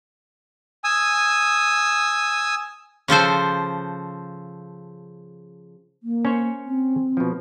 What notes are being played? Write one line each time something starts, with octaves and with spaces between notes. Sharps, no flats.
G#5 D#6 E6
C#3 F3 A4 C5
A#3
C#4 C5 C#5
C4
B2 F3